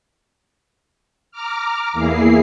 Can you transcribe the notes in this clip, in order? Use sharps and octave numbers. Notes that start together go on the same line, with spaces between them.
A#5 D6 F6
E2 A#3 E4 G#4 C7